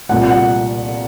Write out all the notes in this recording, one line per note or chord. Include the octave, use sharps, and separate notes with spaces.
C2 A#2 A3 F#5
F#5